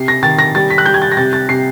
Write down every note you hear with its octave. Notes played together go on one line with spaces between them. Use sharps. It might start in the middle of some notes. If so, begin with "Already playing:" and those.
Already playing: C3 C7
A#6
D#3 A6
A#6
G3 A6
B6
F#6
G3 G6
G#6
A6
A#6
C3 A6
A6
C3 C7